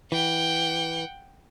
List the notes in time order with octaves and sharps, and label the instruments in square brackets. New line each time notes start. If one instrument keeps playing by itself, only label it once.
[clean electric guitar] E3 [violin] F#5 G5